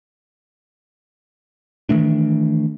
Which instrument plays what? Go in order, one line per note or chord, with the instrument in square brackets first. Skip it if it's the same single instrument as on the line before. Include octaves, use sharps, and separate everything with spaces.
[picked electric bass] D#3 E3 A3 D4